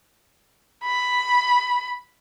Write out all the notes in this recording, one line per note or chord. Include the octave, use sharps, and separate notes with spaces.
B5